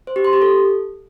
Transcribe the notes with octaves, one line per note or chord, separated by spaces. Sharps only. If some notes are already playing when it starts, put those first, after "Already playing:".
C5
G4
C6
G4
A4